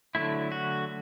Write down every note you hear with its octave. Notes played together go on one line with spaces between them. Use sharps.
D3 F#3 A3 E4
F#4